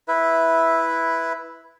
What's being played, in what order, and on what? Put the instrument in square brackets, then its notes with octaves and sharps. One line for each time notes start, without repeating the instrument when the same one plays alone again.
[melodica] E4 B4 E5